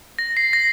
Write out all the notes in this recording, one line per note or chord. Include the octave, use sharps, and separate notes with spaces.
A#6
C7
A#6